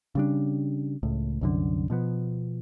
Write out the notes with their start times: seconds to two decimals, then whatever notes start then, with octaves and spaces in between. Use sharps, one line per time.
0.15 C#3 G3 D4
1.03 C#2 A2
1.41 C2 F#2 D3
1.90 B2 F3 B3